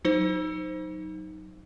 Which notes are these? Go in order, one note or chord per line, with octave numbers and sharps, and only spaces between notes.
F#3 D#4 C5